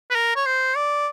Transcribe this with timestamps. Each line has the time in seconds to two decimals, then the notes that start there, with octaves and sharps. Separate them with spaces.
0.10 B4
0.15 A#4
0.36 C#5
0.46 C5
0.76 D5